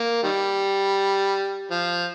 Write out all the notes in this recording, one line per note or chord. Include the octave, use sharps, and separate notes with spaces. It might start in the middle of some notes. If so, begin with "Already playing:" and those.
Already playing: A#3
D#3 G3
F3